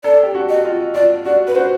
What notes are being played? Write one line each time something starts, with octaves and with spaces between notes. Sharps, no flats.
A4 D5
G4
F#4
D#5
F4
F4 D5
F#4 D5
B4
F#4 C5